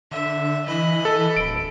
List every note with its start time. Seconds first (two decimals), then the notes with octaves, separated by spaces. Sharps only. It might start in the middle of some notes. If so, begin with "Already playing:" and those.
0.11 D3 E5
0.67 E3 D#5 B5
1.05 A4
1.37 D1 D7